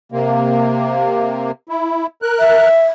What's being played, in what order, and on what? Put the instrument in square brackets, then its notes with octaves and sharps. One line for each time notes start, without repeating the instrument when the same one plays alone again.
[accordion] C3 A#3
E4
A#4 F#6
[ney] E5